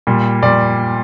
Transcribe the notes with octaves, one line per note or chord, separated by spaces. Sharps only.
A#2 G3
A#2 G3 D5